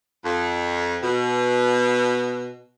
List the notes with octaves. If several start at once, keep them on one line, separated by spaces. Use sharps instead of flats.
F2
B2